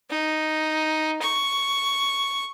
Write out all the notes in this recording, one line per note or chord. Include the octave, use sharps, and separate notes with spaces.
D#4
C#6